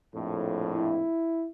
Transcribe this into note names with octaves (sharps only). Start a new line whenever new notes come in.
A#1 F2 A2
E4